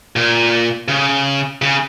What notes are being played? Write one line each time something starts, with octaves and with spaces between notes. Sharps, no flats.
A#2
C#3
C#3